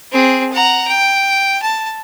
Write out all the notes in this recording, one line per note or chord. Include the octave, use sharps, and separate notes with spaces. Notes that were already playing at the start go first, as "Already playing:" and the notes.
C4 G#4
F#5 A#5
G5
A5